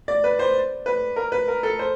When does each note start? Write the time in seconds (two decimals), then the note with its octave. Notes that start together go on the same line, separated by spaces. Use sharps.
0.08 D5
0.24 B4
0.39 C5
0.86 B4
1.16 A#4
1.32 B4
1.48 A#4
1.63 A4
1.79 C5